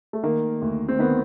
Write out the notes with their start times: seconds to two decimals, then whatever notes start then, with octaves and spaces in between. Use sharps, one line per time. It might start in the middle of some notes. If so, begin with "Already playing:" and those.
0.13 A3
0.23 D#3 A#3
0.62 D2
0.88 C4
0.99 D#3 B3